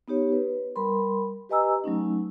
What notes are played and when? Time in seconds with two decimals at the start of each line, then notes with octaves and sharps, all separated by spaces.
0.08 B3 D#4 G4 C#5
0.32 B4
0.76 G3 A#4 B5 C6
1.50 G4 B4 D#5 G#5 A#5 E6
1.84 F#3 A3 C#4 D#4